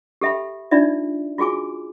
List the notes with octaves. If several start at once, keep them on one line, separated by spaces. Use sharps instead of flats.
G4 A4 E5 G5 B5
D4 D#4 F4 D5 E5
F4 F#4 G#4 G#5 D6